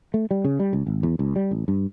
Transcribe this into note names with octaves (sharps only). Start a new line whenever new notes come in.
A3
G3
C#3
G3
C#2
G#1
E2
C#2
G3
A1
G2